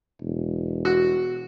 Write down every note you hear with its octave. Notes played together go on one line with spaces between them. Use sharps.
E1
F#4